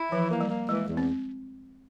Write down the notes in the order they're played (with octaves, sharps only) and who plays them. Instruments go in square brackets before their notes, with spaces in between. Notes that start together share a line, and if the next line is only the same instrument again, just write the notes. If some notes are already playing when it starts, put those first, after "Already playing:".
Already playing: [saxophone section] E4
[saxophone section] E3 [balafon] F3
[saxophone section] A#3
[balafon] G3
[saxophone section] A#3
[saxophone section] E3 [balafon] G#3
[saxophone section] E2
[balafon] C4